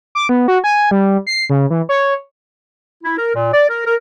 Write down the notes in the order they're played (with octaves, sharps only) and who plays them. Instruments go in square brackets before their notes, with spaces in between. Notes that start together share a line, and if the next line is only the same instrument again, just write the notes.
[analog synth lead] D6
B3
F#4
G#5
G3
C7
C#3
E3
C#5
[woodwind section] E4
A#4
A#2
D5
A#4
A#4